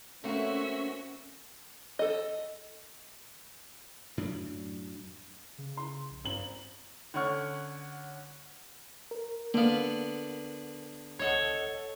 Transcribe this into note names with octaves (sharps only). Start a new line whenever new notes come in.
A3 A#3 C4 C#4 F#4 E5
A4 D#5
F#2 A2 F#3 D4
C#3
C6
A#1
G#1 G2 F#7
D3 C#4 F#5 C#6 F6
A#4
D3 A#3 B3 F5
C2 A4 C#5 D#5 F#5